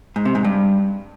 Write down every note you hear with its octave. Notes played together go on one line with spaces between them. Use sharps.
G#2
C3
G#2
G2